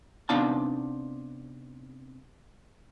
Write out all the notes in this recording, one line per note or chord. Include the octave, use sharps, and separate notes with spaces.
C3 B3 D4 D#4 F5 A5